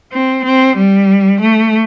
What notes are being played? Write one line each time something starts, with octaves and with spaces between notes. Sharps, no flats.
C4
C4
G3
A3